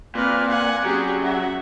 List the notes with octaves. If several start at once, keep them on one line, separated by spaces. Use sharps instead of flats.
A#2 C4 B4 D5 F6
F#5 G#5
F#3 C#4 G4 G#4
F#4 E5